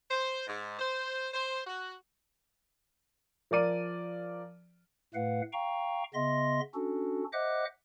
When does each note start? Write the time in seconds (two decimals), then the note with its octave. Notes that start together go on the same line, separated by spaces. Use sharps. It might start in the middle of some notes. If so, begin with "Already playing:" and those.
0.11 C5
0.48 G#2
0.80 C5
1.34 C5
1.66 F#4
3.51 F3 A#4 D5 D#7
5.15 A2 A3 B4 F5 F#5
5.53 F5 G5 A#5 C#6
6.14 C#3 B3 D#5 E5 C6 A#6
6.74 C#4 D4 F#4 A4
7.33 C5 D#5 E5 F#5 D6 F#6